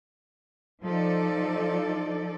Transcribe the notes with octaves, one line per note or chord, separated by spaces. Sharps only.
F3 D#4 A4 D5